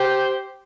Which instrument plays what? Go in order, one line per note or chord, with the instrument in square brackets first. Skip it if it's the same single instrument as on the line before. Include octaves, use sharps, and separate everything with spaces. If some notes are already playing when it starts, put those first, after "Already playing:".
Already playing: [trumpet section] G4 C5